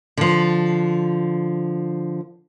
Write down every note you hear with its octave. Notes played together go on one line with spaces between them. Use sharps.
D3 F3